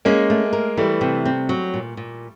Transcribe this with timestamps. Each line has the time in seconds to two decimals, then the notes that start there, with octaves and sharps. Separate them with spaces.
0.05 G#3 A#3 C#4
0.30 A3
0.53 A#4
0.77 E3 G3 A3
1.01 C3
1.25 C4
1.49 F#3
1.74 A#2
1.97 A#2